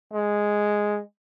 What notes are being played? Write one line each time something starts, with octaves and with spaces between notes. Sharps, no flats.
G#3